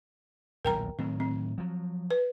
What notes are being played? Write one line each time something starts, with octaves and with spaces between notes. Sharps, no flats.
D#1 B1 E2 A#4 G5 A#5
A2 D#3 F#3 C4
C4
F3 F#3
B4